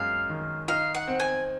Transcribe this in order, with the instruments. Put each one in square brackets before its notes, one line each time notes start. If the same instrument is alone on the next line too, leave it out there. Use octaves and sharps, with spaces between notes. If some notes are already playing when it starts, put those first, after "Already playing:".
Already playing: [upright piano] F#2 G#3 [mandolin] F5
[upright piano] D#3
[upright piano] D#4 [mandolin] F5
[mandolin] F#5
[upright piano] C4
[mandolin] G#5